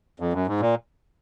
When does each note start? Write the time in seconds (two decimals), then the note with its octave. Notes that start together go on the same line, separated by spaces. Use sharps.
0.20 F2
0.33 F#2
0.47 G#2
0.61 A#2